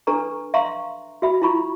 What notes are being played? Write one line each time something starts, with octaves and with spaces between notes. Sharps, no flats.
D4 A4 B4 A#5 C#6
E5 F5 A#5 C6 C#6
F#4 E5 B5
E4 F4 A#5 B5 C#6